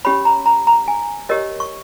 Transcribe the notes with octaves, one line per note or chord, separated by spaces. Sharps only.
C#4 G4 C#5 B5
A#5
A#5
A#5
G#5
G4 A#4 C#5 D#5
C#6